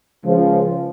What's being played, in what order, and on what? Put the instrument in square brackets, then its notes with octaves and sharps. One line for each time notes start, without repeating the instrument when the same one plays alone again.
[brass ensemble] C#2 C#3 F3